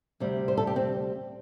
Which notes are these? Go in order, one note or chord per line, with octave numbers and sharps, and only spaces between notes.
D2 C3 G3
C5
A4
G4
C4